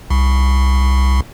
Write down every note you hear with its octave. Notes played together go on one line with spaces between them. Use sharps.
C2